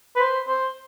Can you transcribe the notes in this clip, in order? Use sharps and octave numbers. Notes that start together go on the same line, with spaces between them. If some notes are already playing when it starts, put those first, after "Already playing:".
B4
C5
C5